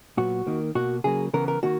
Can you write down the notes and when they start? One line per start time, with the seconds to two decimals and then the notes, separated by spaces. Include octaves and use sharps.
0.17 A#2 F#3 B3 F#4
0.46 D#3 A#3
0.75 B2 A#3 F#4
1.04 C#3 F#3 A#3 G#4
1.33 C#3 E3 B3 A#4
1.48 A#4
1.63 D#3 A#3 F#4